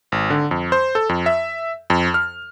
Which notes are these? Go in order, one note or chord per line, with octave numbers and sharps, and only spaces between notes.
G#1
D3
F2
C5
A4
F2
E5
F2
F6